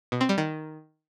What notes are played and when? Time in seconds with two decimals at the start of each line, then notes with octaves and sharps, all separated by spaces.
0.12 B2
0.21 C4
0.29 G3
0.38 D#3